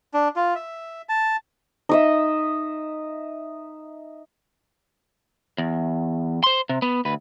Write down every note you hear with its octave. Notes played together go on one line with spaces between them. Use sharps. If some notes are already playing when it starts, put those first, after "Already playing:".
D4
F4
E5
A5
D#4 D#5 E5
E2
C5 C6
C3
B3
D2 B4